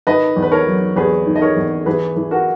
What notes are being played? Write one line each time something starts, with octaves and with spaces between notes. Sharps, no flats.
D#3 B4 D#5
E2
B4
A#4 C#5
F#3
E2 G#4 B4
D#3
D#5
A#4 C#5
E2
E3 G#4 B4
E3
F#4 A#4